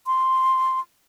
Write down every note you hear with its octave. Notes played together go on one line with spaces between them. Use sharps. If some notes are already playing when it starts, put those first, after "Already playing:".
C6